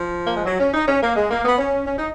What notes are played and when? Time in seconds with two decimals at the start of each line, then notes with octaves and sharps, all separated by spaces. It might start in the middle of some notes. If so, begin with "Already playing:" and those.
Already playing: F3
0.27 A#3
0.37 G#3
0.46 F#3
0.60 C#4
0.74 D#4
0.88 C#4
1.02 A#3
1.16 G#3
1.31 A#3
1.45 B3
1.58 C#4
1.87 C#4
1.98 D#4